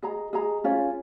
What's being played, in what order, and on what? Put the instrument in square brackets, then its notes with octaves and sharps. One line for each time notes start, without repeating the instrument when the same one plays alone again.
[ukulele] G#4 D#5 A#5
G#4 D#5 A#5
C#4 F4 G#4 C#5